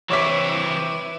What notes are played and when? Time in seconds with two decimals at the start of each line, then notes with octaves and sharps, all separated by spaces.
0.10 E3 C4 E4 B4 C#5 D6 B6